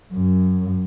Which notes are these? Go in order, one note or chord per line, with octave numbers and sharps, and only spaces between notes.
F#2